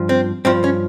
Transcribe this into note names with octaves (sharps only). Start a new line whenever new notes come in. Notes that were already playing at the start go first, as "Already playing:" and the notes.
Already playing: G2 F3
C4
G2 F3 C4
C#4